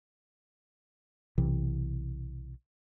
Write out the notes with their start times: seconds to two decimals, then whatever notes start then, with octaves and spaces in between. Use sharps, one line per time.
1.38 B1 C3 E3